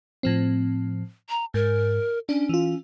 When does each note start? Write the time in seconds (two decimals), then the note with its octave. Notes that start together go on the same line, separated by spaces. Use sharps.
0.23 A2 F3 C4
1.30 A#5
1.54 G#2 A#4
2.29 C#4 D4
2.49 E3 F4